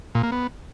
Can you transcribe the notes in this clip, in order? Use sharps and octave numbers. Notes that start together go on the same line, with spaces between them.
A#2
A#3
B3